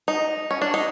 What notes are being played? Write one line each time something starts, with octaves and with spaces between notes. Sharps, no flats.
D#4
C#4
D4
D#4